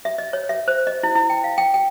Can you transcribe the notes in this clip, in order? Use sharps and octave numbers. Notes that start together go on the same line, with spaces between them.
E5
D#5
C#5
E5
C5
D#5
E4
E4
G5
F5
G5
G5